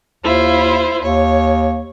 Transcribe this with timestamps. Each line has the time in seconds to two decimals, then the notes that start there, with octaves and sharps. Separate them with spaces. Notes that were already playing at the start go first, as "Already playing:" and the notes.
0.24 D#2 E4 F4 C5
1.01 D#2 C#5